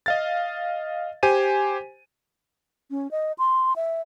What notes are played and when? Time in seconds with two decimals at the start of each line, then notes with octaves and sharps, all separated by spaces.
0.06 D#5 F5 A6
1.23 G4 C5 G#5 D#7
2.91 C#4
3.11 D#5
3.39 C6
3.76 E5